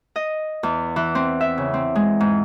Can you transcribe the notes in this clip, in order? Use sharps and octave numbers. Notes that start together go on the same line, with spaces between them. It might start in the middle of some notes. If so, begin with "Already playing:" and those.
D#5
E2
E3
C4
E5
C#3
C4
G#3
G#2